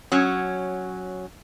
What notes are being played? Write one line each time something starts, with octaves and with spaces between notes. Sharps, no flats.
F#3 C#4